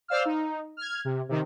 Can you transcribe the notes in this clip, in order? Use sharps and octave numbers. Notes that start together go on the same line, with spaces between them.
C5 D5 F5 E6 F6
D#4
F6 G#6
C3
C3 D#3